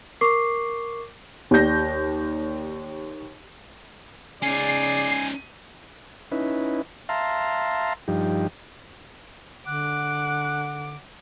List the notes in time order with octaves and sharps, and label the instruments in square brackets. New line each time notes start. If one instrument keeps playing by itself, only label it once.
[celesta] A#4 C#6 D6 C7
[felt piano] D#2 G4 D5 G6 A#6
[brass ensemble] C#3 D5 [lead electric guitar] C#4 D#4 [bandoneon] G#5 [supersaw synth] C7
[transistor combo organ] C#4 D#4 E4 B4
E5 F5 A5 A#5 C6
G2 F3 D#4 G4
[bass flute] D3 [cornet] F#5 [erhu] D6 [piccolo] F#6